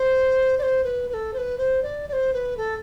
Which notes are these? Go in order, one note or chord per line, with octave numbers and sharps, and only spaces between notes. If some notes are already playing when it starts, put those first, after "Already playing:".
Already playing: C5
D5
C5
B4
B4
A4
C5
B4
C5
D5
D5
C5
B4
A4